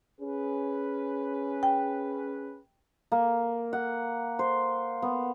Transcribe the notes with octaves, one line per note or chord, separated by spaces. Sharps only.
C#4 G#4 B4
G5
A#3
F#5
C5
B3